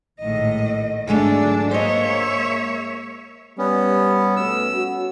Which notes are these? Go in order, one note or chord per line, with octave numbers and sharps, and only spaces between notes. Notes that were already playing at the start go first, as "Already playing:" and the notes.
A#1 A2 D#3 G#3 D#5
G#1 E2 D3 F#3 G#3 A3 D4
G#3 A#3 C5 C#5 D#5 E5
G3 B3 C#4
B2 A3 E6
C#4 F#4